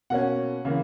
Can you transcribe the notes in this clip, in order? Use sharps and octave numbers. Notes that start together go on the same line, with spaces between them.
B2 A#3 C#4 F#5
C#3 E3 A#3